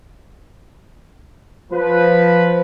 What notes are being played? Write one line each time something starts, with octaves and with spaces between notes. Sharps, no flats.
F3 B4